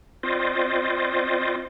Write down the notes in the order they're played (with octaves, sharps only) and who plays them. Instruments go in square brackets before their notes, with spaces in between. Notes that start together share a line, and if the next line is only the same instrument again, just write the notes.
[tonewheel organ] C4 F4 C5 D5 D#5